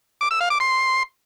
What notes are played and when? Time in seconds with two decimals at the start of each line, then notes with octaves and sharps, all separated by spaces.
0.21 D6
0.31 E6
0.41 F5
0.50 D6
0.60 C6